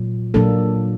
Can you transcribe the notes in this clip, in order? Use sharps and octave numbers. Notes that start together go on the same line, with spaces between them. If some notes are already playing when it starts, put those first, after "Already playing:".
Already playing: A#2 F#3
A#2 F#3 A#3 D4 A4